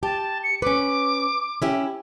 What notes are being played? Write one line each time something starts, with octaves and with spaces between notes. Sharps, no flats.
G4 A5
C#7
C#4 B4 D6
C#4 E4 G4